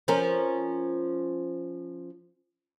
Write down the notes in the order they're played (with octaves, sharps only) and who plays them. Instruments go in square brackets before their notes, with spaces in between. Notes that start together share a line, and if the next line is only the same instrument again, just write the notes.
[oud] F3 C#4 A#4